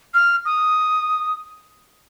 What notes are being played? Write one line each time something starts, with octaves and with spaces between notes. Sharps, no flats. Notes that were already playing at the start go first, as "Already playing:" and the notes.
F6
D#6